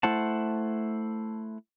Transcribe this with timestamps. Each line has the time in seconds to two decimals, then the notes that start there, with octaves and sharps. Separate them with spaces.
0.03 A3 E4 C5 F#5 A5